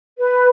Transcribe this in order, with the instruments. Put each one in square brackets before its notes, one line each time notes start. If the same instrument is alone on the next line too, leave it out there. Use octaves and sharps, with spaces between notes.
[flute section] B4